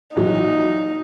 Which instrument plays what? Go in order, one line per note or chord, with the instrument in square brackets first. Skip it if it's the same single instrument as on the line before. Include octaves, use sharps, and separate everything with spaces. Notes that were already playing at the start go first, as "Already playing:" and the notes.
[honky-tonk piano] A#1 E3 F#3 [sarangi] D#4